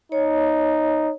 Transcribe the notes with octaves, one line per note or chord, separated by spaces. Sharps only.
D#4 C#5